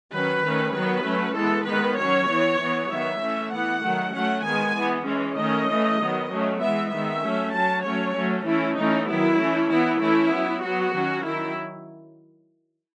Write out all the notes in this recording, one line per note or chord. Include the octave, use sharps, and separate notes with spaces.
D#3 F#3 C#4 B4
D#3 A3 C#4
D#3 F#3 B3 B4
F#3 A3 C#4
E3 G#3 B3 A4
D#3 G#3 B3 B4
F#3 C#4 C#5
E3 B3
E3 B3
D#3 F#3 B3 E5
E3 A3 C#4
E3 B3 F#5
D#3 F#3 A3
F#3 A3 C#4 F#5
D#3 G#3 B3 G#5
E3 B3
E3 G#3 C#4
D#3 A3 C#4 D#5
E3 A3 C#4
D#3 F#3 B3
F#3 A3 C#4
E3 G#3 B3 E5
D#3 G#3 B3 E5
F#3 A3 C#4
F#3 C#4 A5
F#3 A3 C#4 C#5
F#3 A3 C#4
E3 A3 C#4 E4
E3 A3 C#4 D#4
D#3 F#3 B3 E4
E3 A3 C#4
E3 B3 E4
E3 A3 C#4 E4
F#3 B3
F#3 B3 F#4
D#3 F#3 C#4
D#3 F#3 E4